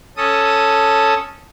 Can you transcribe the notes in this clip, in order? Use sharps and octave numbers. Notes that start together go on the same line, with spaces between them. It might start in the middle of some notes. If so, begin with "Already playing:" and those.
C#4 A4 D#6